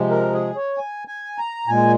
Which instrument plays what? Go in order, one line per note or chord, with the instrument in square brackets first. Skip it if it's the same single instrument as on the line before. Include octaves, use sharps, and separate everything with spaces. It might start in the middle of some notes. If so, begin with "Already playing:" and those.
Already playing: [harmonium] C3 F3 G#3
A#4
G#4
C#5
G#5
G#5
A#5
A#2 G#3 G#5